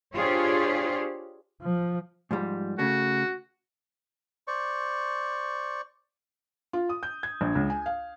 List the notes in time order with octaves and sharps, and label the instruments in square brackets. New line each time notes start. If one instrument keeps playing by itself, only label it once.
[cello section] D4 F4 G4 G#4 C5 C#5
[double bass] F3
[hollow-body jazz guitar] G#2 F3 G3
[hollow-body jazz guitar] C#3 A3 [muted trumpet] F#4
[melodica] C5 D5 C#6
[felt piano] F4
D#6
G6
G#6
A#1
C#2
G#5
F5